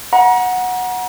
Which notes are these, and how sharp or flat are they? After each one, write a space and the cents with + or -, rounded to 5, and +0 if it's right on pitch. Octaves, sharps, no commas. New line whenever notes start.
F#5 -10 A#5 +35